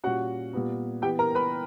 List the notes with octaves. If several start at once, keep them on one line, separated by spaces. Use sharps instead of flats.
A#2 G3 C#4 F#4 F#5
A#2 G3 B3
E3 B3 G4 G5
A#4 A#5
B4 B5